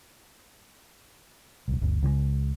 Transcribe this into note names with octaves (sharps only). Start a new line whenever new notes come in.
D#1 C2
G1 D2
C#2 C#3 F3 G#3